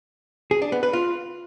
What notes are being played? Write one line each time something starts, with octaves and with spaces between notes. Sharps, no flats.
G#4
D4
B3
B4
F4